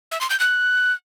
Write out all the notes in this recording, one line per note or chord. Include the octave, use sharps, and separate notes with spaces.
E5
C6
G6
F#6